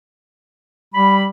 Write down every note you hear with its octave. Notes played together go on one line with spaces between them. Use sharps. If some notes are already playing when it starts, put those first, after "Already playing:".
G3 B5